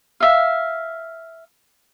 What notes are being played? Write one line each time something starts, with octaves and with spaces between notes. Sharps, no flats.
E5 F5